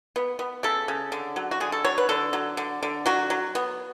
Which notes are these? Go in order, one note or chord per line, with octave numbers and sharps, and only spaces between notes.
B3
B3
C#3 A4
C#3
D3
F#3
F#4
D3 G#4
A4
F#3 C#5
B4
D3 A4
F#3
D3
D3
F#3 F#4
F#3
B3